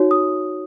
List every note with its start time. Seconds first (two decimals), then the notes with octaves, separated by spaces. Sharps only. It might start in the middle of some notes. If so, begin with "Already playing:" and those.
Already playing: D#4 F#4 C#5
0.11 D#6